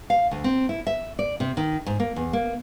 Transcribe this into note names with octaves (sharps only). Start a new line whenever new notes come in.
F5
D2
C4
E4
E5
D5
C3
D#3
G#2
A#3
E2
A#3